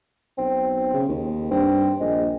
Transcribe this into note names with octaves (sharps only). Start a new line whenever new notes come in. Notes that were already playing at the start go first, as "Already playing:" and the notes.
B1 C4
C#3
D#2
G2 C4
A#1 G#3